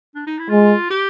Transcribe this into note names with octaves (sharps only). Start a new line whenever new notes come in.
D4
D#4
E4
G#3 F4
G4